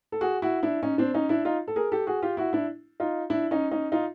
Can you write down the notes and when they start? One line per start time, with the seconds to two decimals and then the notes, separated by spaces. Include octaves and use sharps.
0.12 A4
0.21 F#4 G#4
0.42 E4 F#4
0.63 D4 E4
0.83 C#4 D#4
0.98 C4 D4
1.14 C#4 D#4
1.29 D4 E4
1.45 D#4 F4
1.68 A4
1.76 G#4 A#4
1.92 G4 A4
2.07 F#4 G#4
2.22 F4 G4
2.37 E4 F#4
2.53 D4 E4
3.00 D#4 F4
3.30 D4 E4
3.51 C#4 D#4
3.71 C#4 D#4
3.92 D#4 F4